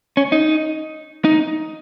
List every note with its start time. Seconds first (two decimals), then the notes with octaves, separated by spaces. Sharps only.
0.17 C#4
0.32 D#4
1.25 D#4